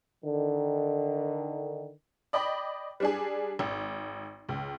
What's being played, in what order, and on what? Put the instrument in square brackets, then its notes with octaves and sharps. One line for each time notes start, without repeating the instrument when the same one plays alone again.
[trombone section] D3 D#3
[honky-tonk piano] D5 D#5 G5 B5
G3 D4 G#4
G#1
C#2